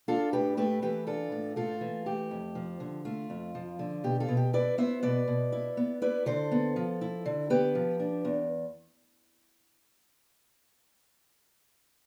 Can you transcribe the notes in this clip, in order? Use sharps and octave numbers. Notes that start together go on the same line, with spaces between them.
D4 F4 A4
A2 G4 B4
A3 G4 B4
E3 G4 B4
D4 F4 A4
A2
A3 F4 A4
E3
A3 G4
F2
F3
D3
A3 F4
F2
F3
D3
B2 G4
F4 A4
B2
G4
E4 B4 D5
B3 C5 E5
B2 B4 D5
B2
E4
B3
E4 B4 D5
D3 A4 C5
B3
F3
E4
D3
B3 G4 B4
F3
D4
E2